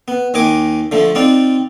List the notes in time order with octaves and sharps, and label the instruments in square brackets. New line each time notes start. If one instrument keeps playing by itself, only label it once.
[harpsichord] B3
D#2 D#3 D#5 G#5 D6
D3 F3 A3
C4 D#4 F4 D5